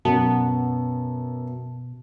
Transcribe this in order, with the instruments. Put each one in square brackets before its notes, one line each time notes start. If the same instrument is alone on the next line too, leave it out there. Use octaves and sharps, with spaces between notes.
[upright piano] F#2 [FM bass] B2 [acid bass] B3 [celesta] A5